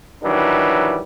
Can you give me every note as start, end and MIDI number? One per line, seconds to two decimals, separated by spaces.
0.23 1.01 51
0.23 1.01 52
0.23 1.01 54
0.23 1.01 55
0.23 1.01 62